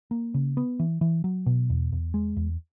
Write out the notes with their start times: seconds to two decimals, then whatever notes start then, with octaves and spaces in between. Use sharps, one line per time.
0.11 A#3
0.34 C#3
0.57 B3
0.79 E3
1.01 E3
1.24 F#3
1.46 B2
1.70 E2
1.92 E2
2.14 G#3
2.37 E2